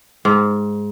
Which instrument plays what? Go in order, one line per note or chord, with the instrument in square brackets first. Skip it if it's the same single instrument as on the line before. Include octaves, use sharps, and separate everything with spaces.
[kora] G#2